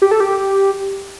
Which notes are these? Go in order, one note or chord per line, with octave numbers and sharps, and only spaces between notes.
G4
A4
G4